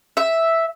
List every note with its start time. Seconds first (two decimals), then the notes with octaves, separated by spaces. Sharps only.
0.17 E5